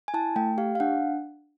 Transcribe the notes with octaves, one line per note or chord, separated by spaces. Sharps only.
G#5
E4 A5
A3 G5
G4 F5
F5
D4 F#5